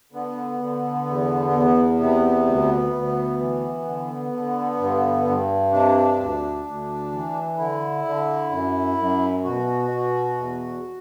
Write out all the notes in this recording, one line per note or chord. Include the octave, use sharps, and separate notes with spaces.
D3 B3
D3
E2
E2
C3 B3
D2
D2
E3
D3
D3
G2
G2
C3 D4
D2
D2
E3
D3 E4
D3
F#2
F#2
B2 F#4
B2
E2